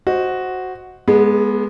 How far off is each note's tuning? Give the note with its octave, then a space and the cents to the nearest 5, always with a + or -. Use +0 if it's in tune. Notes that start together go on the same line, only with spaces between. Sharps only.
F#4 +0 C5 +0 D#5 +10
G#3 +0 B3 -20 A4 -40